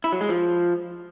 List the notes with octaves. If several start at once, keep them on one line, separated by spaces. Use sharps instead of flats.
E4
F#3
G#3
F3